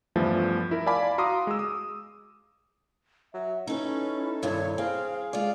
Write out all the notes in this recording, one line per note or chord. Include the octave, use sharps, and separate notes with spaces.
E2 G2 E3 F3 A3
E4 A#4
D5 F5 G#5 A5 B5 D6
F#4 F5 A#5 C6 D6 D#6
G#3 E6
D#6
F#3 E5
C#4 D#4 E4 A4 B4
G2 C3 D#3 C#5
C4 G#4 F5
G#3 F4 D5 F5